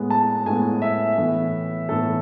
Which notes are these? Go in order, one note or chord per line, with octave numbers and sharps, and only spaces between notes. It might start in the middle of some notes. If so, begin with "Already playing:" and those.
Already playing: A2 G#3 B3
A5
A2 G#3 B3 G#5
E5
A2 E3 B3
A2 E3 B3 A4